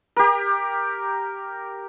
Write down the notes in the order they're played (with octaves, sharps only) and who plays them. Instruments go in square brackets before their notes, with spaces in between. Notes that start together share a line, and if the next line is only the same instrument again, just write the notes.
[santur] G4 A#4